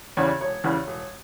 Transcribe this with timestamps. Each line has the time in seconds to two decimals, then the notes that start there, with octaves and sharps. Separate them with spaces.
0.17 E2 C#3 E3 G3 C#5
0.41 E1 C#5
0.64 E2 C#3 E3 G3
0.87 E1